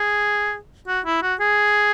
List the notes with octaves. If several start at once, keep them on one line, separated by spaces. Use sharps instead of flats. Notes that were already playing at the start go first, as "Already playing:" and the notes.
Already playing: G#4
F#4
E4
F#4
G#4